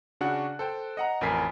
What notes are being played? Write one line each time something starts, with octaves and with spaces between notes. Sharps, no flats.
C#3 D4 F#4 F#5 F#6
A4 C5 G5
D#5 F#5 A#5
A1 F2 A#4 G#5 B6 C7